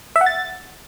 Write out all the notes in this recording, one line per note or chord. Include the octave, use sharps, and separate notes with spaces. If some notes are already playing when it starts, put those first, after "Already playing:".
E5
F#5
A6